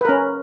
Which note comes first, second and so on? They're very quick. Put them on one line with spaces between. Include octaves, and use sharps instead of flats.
B4 A#4 C#4